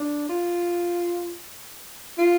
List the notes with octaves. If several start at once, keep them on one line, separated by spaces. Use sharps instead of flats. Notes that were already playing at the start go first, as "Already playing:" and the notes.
Already playing: D4
F4
F4